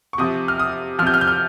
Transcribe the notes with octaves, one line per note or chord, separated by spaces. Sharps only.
C#6
C3 F3 D#6
F6
D#6
C3 F3 F6
G6
F6
G6
F6